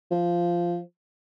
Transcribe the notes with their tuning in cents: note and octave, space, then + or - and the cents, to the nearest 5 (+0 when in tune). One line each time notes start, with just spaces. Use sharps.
F3 -10